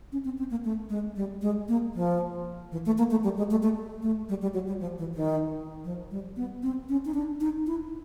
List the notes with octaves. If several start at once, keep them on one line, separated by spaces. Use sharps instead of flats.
C#4
C4
C4
A#3
A3
G#3
G3
G#3
A#3
F3
E3
A3
A#3
A3
G3
G#3
A3
A3
A3
G3
G3
F#3
G3
F3
E3
D#3
F3
G3
B3
C4
C#4
D#4
D4
D#4
E4